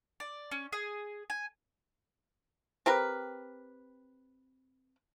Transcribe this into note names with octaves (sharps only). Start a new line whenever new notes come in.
D5
C#4
G#4
G#5
C4 G4 A#4 B4